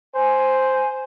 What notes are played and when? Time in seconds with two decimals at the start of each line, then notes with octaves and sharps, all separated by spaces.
0.15 C5 G#5